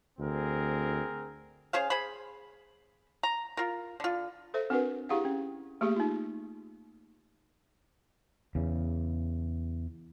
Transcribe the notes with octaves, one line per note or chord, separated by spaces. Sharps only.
D2 C4 G#4 A#4
C#4 G#4 C5 F5
G#4 C5 B5
A#5
F4 A#4
D3 F4
A4 C5 E5
C4 D4 F#4 A#4 B4 F#5
E4 G4 G#4 F5 F#5
C#4
A3 A#3 G4 G#4
D#4 F4
E2 C#3